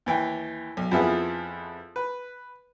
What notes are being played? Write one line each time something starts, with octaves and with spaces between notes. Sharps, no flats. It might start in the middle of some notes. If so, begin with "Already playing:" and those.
D#2 E3 G5
B1
F2 F3 B3 E4 G#4
B4